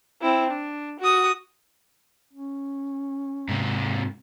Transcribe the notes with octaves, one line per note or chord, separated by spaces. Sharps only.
C4 E4
D4
F#4 D#6
C#4
G#2 C3